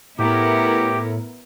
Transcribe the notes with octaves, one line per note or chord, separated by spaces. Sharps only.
A2 B3 E4 G4 A#4